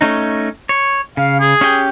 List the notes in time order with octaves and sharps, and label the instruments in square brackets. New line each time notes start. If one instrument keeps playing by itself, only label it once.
[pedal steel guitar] A3 C#4 D#4
C#5
[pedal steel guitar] C#3 [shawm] F5
[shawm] G#4
[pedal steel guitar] C#4 G4 G5